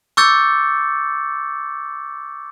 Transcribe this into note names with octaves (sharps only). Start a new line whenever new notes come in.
C#6 D6 E6 G6 A6 C#7